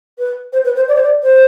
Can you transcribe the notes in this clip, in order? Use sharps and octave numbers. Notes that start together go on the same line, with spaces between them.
B4
C5
B4
C5
D5
C5
D5
C5